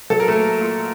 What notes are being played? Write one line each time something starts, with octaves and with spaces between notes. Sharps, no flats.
F#3 A4
A#4
A3 A4
A#3
A#2